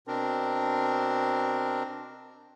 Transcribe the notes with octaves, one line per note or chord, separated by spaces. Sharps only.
B2 C4 D4 A#4